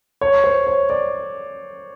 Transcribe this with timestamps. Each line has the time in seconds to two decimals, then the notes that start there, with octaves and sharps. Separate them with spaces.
0.21 C#5
0.44 C5
0.67 C#5
0.90 D5